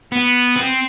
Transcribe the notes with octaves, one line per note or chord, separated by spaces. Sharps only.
B3
C4